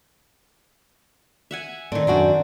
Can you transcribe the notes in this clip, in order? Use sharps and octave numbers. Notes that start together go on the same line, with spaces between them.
E5 F#5 G#5
A2 D#3 C4 D5
F#2 D4 F#4